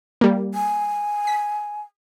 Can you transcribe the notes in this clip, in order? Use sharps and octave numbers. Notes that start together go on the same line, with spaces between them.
G3 A#3
G#5
B6